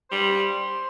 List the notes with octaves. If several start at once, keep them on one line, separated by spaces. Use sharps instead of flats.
G3 C5